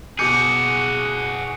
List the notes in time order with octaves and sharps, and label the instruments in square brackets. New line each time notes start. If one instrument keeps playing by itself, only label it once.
[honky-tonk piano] B2 D6 G6 [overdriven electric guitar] F#4 G#4 [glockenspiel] C#7